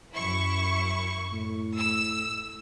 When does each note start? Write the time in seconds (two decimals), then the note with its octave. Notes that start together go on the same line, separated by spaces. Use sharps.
0.14 F#2 E4 C#6
1.32 A2
1.76 E6